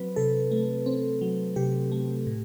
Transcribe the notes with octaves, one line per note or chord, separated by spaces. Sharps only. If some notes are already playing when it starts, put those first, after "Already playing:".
Already playing: F#3 C4 B4
C3 A4
A3
C4
F#3
C3 G4
A3
A2